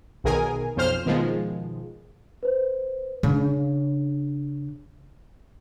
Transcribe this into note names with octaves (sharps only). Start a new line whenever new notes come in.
B1 B2 D#3 G#4 A#4 G#5
B1 F2 C5 F6
B2 D#3 F3 G#3
B4 C5
C#3 D4